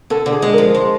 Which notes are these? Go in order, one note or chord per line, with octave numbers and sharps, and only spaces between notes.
D3 A4
D3
G#4
G#3
F3 A#4
G#3 C5